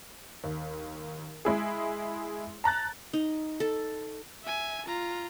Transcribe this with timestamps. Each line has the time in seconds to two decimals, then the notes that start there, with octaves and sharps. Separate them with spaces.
0.44 D#2
1.45 G#3 E4 G#4
2.64 A5 A#5 F#6 A6
3.13 D#4
3.60 A4
4.44 E5 G#5
4.86 F4 A#5